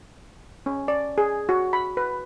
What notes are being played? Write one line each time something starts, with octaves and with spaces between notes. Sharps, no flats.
C#4
D5
G#4
F#4
B5
B4